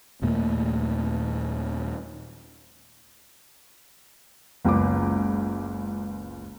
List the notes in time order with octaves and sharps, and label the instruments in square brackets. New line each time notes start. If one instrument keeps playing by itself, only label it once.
[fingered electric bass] D#2 A#2 A3 A#3
[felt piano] F#1 C#2 B3 D6